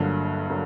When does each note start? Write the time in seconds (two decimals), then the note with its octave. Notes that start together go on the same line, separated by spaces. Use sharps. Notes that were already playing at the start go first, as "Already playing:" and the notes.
Already playing: G1 G2 D3 F#3 A#3
0.49 D3 F#3 A#3